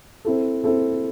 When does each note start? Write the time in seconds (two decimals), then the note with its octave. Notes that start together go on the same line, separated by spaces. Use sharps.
0.25 C4 E4 A4
0.64 C4 E4 A4